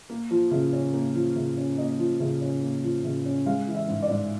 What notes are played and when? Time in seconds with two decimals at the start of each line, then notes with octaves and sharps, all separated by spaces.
0.10 A#3
0.31 F3
0.51 C#3
0.73 C#4
0.94 A#3
1.15 F3
1.36 C#3
1.57 C#4
1.78 A#3 D#5
1.99 F3
2.20 C#3
2.41 C#4
2.62 A#3
2.83 F3
3.04 C#3
3.26 C#4
3.46 G#3 F5
3.67 E3
3.75 E5
3.88 G#2
4.02 D5
4.09 G#2